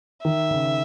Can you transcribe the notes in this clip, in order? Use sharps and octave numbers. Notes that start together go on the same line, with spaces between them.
D#3 E5
C#3